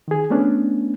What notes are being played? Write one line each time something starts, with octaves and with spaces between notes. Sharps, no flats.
D#3 G#4
A3 B3 C#4 D4